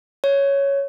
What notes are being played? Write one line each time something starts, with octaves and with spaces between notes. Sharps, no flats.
C#5